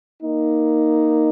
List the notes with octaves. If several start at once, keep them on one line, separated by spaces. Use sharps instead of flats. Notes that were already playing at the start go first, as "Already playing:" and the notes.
A#3 D#4